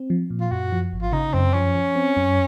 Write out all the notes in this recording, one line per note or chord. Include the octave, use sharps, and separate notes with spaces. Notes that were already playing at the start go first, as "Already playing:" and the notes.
Already playing: C4
F3
A#2
F4
F#2 F#4
F3
G#1
F4
C#3 D#4
F#2 C4
F3 C#4
F3
C4
F#2